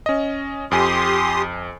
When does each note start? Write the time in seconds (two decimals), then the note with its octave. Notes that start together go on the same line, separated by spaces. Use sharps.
0.06 C#4 D#5
0.71 F2 G4 G#5 C6 D#6